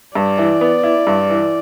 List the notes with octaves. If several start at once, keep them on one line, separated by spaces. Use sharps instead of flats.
G2 D5
E3
B3
E4
G2
E3